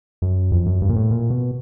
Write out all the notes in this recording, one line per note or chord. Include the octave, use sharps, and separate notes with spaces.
F#2
F2
F#2
G2
A#2
A2
A#2
B2